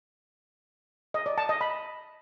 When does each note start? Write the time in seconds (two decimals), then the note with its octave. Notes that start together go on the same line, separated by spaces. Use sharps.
1.14 D#5
1.26 D5
1.38 A5
1.49 D#5
1.61 B5